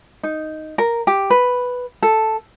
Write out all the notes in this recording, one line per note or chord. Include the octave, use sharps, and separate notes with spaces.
D#4
A#4
G4
B4
A4